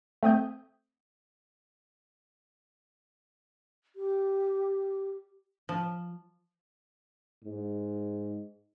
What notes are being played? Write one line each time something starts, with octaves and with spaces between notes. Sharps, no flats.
A3 C4 D#6 G6
G4
F3
G#2